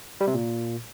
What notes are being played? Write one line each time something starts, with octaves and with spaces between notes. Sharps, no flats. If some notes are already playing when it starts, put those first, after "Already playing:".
G3
C3
A#2